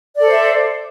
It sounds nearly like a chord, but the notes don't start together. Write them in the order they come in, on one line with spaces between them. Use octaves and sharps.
D5 A4 C5 E5